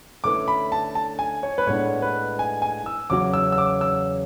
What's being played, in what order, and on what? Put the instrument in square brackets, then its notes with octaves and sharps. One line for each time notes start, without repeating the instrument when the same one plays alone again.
[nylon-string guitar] D3 A3 C#4 E4 B4 [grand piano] D6
[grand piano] B5
A5
A5
G#5
C#5
B4
[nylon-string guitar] A2 G#3 B3 D4 [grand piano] C#5
[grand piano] B4
G#5
G#5
E6
[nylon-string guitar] E2 C#3 F#3 C#4 F#4 [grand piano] D6
[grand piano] E6
E6
D6
E6